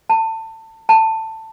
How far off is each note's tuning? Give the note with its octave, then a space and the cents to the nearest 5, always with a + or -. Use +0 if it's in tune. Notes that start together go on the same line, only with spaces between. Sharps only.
A5 +25
A5 +15